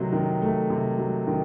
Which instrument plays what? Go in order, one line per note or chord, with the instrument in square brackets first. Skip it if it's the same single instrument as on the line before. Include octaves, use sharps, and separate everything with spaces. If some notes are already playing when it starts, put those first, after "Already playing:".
Already playing: [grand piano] C3 D#3 F#3 A3
D#3
A3
C3
F#3
D#3